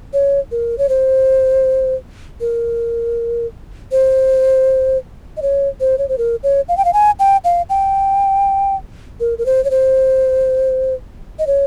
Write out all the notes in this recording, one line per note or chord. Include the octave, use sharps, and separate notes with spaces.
C#5
A#4
C#5
C5
A#4
C5
D#5
C#5
C5
C#5
C5
A#4
C#5
F5
G5
F5
G#5
G5
F5
G5
A#4
A#4
C5
C#5
C5
D#5
C#5